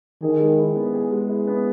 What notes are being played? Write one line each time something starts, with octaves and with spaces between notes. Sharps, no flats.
D#3 G#4
G#3
E4
B3
G#4
G#3
E4
B3